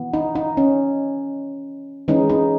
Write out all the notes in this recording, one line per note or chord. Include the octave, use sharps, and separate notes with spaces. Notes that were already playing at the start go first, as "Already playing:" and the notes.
Already playing: E3 B3
D#4
D#4
C#4
E3 G#3 C#4 D#4
D#4